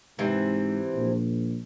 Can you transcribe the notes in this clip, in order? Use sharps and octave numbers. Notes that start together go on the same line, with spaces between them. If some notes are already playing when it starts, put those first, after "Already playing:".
G#2 C3 E3 C4
A#1